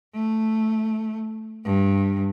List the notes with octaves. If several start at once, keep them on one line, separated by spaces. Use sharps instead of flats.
A3
G2